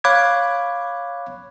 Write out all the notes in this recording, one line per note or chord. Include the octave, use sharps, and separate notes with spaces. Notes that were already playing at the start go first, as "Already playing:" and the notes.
C#5 F5 B5 D6 F#6 G#6